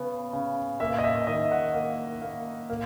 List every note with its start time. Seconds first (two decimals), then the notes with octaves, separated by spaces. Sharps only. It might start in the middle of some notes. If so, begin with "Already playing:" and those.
Already playing: C#3 B3
0.33 C#3
0.80 A#3 E5
0.98 D#5
1.04 E5
1.27 D#3 D#5
1.51 F#5
1.74 A#3
2.22 A#3
2.70 A#3